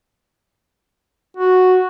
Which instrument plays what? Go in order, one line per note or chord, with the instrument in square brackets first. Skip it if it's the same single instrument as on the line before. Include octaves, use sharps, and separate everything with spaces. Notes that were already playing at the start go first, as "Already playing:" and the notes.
[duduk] F#4